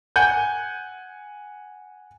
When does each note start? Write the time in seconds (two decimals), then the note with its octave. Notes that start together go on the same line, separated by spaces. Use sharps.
0.16 F#5 G#5 G6